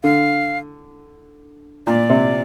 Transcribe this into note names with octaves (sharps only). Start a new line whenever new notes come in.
D3 F5
A#2 D5
C3